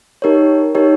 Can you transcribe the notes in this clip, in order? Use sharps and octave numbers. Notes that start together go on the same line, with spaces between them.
D#4 G4 A#4 C#5
D#4 G4 A#4 C#5